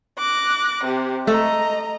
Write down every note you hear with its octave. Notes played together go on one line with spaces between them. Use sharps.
D6 F#6 A#6
C3 G4
A3 A4 D#5 A#5